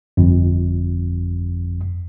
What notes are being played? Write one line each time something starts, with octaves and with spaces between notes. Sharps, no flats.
G1 F2